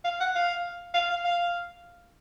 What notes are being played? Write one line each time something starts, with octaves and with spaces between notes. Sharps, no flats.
F5
F#5
F5
F5
F5
F5